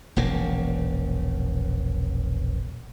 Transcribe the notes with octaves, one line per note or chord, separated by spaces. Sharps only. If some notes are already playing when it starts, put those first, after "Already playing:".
E1 A#1 C#3 A#3